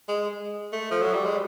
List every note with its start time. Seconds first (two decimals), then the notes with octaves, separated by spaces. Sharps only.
0.09 G#3
0.73 A3
0.91 F3
1.02 F#3
1.14 G3
1.25 G#3